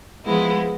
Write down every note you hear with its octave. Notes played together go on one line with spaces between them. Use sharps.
F3 G#3 B3 E4